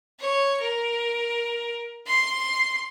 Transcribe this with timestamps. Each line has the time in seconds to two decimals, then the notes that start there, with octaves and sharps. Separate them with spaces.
0.19 C#5
0.61 A#4
2.07 C6